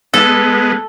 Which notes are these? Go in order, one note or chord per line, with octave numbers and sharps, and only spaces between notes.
G#3 B3 A4